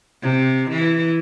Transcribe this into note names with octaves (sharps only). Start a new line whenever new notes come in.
C3
E3